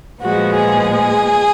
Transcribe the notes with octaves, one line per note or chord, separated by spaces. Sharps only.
A#2 F3 G#3 B3 F#4
G#4